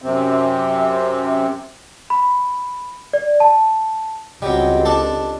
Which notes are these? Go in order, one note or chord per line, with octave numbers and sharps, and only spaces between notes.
F#2 C3 C4
B5
D5
A5
C#2 F#3 G3 C4 F4 G4 D#5
D4 A4 A5